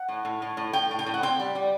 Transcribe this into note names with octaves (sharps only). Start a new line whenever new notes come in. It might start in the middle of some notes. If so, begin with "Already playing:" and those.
Already playing: F#5
A2
A2
A2
A2
A2 G5
A2
G5
A2
F#5
C4 G5
G3
G3